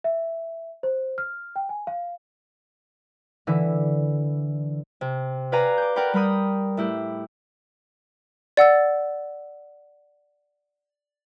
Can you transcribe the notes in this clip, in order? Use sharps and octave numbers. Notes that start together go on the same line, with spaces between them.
E5
C5
F6
G5
G#5
F5
D3 E3 E4
C3
B4 D5 F5 G#5 A#5
D6 G6
A#4 D5 F#5 G5 B5
G3 A#4 B5 D#6
A2 E4 G4
D5 F#5 E6 A6